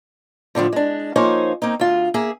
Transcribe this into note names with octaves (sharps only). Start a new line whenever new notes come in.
A2 D3 D#3 F3
G#3 D4
F3 A#3 D#4 C5 C#5 G#5
A#3 C4 D#4
D2 F4
A#3 G#4 E5